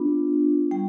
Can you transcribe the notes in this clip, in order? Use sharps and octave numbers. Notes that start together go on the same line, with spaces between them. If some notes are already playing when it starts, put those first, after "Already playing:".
Already playing: B3 D4 F4
G3 G5